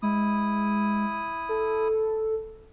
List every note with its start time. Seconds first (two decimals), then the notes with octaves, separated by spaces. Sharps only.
0.02 G#3 E4 D#6
1.49 A4